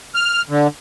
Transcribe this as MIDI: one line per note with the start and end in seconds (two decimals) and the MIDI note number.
0.15 0.42 89
0.49 0.67 50